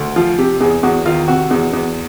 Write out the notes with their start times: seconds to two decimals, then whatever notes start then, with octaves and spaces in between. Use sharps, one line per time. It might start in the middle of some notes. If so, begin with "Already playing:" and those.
Already playing: D2
0.16 F3 F4
0.38 C3 G4
0.61 E2 G#4
0.83 E2 F#4
1.06 D#3 F4
1.28 C3 F#4
1.51 E2
1.73 E2